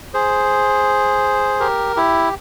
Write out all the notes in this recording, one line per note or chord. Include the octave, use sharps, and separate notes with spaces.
G#4 C5
G4 A#4
E4 G4